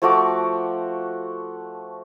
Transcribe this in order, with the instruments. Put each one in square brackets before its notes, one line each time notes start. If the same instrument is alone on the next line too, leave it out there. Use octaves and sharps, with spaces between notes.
[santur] F3 A3 F#4 D6